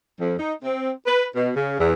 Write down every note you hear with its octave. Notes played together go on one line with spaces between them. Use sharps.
F2
D#4
C4
B4
B2
C#3
E2